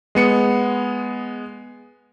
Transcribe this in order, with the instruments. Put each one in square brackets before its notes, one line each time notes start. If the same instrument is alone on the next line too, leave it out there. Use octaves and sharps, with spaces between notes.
[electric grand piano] G#3 B3 C#7